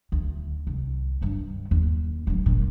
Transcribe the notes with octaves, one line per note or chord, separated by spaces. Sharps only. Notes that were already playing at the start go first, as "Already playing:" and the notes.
D2
C2
G2 G3
D#2
D1 F#3
G1 A#2